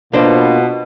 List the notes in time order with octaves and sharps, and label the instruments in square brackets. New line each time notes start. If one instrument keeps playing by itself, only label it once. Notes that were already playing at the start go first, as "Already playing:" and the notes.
[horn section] B2 [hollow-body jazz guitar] A#3 D4 C5 [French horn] F4